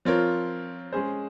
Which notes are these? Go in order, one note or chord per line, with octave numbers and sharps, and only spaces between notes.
F3 C4 F4 A#4 C#5
G#3 C#4 G#4 C5